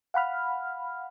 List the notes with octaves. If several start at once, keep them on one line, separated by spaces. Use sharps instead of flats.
F5 F#5 B5 F6